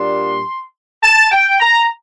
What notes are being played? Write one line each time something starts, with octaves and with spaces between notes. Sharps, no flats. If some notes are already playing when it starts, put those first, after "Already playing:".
Already playing: A#2 G3 A#3 D4 C6
A5
G5
A#5